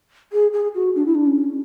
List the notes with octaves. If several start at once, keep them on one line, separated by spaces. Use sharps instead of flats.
G#4
G#4
F#4
D4
E4
D4
C#4